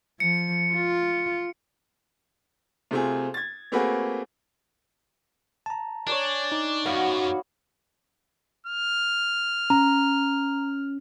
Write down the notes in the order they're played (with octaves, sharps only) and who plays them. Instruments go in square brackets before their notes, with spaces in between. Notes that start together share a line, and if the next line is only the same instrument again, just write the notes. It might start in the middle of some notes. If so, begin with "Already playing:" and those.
[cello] F3 [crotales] C#7
[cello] F4
[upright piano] C3 A3 C4 F4 G#4
G#6 A6
A3 A#3 C4 F#4 G#4 B4
[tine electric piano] A5 A#5
[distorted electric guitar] D4 [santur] C#5 D5 G#5
[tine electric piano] D#4
[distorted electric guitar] F#2 [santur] B3 F5 [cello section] F#4
[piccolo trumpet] F6
[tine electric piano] C#4 [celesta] A#5